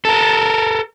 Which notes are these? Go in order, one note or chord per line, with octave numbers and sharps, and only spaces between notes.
A4 A#4